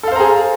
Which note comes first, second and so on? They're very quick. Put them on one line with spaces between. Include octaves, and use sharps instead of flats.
A4 F5 C5 A#5 G#4